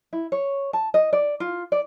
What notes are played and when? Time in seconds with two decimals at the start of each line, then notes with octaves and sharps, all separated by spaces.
0.13 E4
0.32 C#5
0.73 A5
0.94 D#5
1.13 D5
1.40 F4
1.72 D5